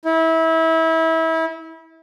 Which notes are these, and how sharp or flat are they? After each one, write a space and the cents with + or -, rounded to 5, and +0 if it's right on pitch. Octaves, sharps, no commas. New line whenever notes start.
E4 -25